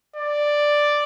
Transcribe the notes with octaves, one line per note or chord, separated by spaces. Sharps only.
D5